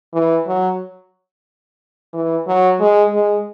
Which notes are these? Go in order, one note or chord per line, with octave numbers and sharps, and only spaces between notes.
E3
F#3
E3
F#3
G#3
G#3